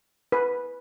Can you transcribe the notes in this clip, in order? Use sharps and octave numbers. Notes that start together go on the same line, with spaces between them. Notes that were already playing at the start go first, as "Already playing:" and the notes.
B4